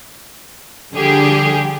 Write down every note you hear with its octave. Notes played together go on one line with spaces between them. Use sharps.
D3 F3 G3 G4 G#4